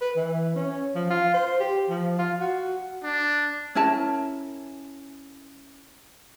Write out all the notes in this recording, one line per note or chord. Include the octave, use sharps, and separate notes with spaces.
B4
E3
C#4
F3
F4
C5
G4
F3
F4
F#4
D4
C#4 E4 A#4 A5